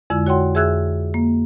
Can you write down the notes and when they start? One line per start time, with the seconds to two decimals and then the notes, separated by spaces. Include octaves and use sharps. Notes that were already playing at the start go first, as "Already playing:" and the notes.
0.10 F2 D3 G#3 E4 E6
0.26 F#4 C#5 F#5 G5 C6
0.54 F2 G#4 E5 E6 F#6 G#6
1.14 A#3